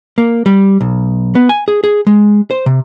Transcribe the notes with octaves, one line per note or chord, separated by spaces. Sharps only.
A#3
G3
B1
B3
G#5
G#4
G#4
G#3
C5
C3